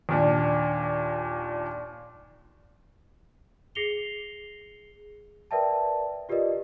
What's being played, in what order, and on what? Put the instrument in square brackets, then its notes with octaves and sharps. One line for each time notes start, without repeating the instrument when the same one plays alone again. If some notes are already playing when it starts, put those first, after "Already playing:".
[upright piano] D#2 A#2 D4
[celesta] G#4 A#6 C7 C#7 F7 G7
A#4 B4 D5 E5 G5 A5
F4 G4 A#4 B4 D5 D#5